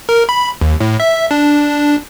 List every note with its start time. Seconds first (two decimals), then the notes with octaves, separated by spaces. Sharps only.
0.09 A#4
0.29 B5
0.61 D#2
0.81 A2
1.00 E5
1.31 D4